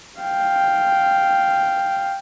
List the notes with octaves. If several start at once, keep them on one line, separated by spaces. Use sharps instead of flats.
F5 G5